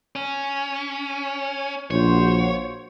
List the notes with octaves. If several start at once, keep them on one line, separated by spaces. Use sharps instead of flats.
C#4
A#1 A#3 F#4 C5 C#5